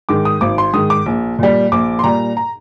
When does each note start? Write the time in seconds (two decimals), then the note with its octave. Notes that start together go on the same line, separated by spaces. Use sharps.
0.09 G#2 D#3 D6
0.25 D#6
0.41 G#1 D6
0.58 C6
0.73 G#2 D#3 D#6
0.90 D6
1.06 A#1
1.39 A#2 G3
1.72 A#1 D6
1.99 C6
2.04 A#2 G3 A#5
2.37 A#5